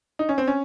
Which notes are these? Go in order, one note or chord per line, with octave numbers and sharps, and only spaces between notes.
D#4
C#4
C4
C#4